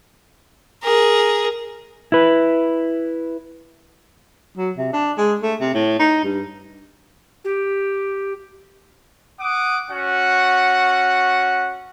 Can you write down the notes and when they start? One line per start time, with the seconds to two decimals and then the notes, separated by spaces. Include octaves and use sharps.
0.83 G#4 A#4
2.12 E4 B4
4.57 F#3
4.77 C3
4.93 D4
5.18 G#3
5.43 A3
5.61 C3
5.74 A2
5.99 D#4
6.24 G2
7.44 G4
9.40 F#5 D6 D#6
9.91 C#4 F#4 F#5